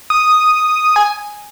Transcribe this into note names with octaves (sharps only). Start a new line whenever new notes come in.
D#6
G#5